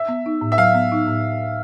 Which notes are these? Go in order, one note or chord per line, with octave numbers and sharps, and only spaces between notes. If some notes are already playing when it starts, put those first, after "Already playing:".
Already playing: E5
B3
D#4
A2
E5
F#3 F5
B3
D#4
A2